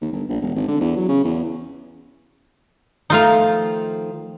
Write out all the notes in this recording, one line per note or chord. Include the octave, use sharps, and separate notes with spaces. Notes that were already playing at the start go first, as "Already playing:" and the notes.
D#2
G1
A#1
E1
G#1
D3
E2
F#3
C#3
E2
D#3 F3 A3 D#4 F4 F5